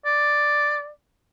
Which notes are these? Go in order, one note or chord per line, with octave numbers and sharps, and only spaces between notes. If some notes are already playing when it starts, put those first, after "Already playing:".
D5